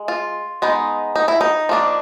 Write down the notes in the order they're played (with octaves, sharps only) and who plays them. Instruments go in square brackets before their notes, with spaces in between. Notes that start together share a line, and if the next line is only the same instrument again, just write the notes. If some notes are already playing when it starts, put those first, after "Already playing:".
Already playing: [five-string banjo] G#3
F4
G#3 B3 D#4
D#4
E4
D#4
F3 A#3 D4